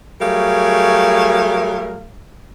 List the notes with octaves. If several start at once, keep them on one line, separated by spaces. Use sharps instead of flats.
F#3 G3 A3 G#4 A#4 F5